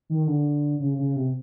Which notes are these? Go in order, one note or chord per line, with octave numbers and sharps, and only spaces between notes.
D#3
D3
C#3
C#3
C3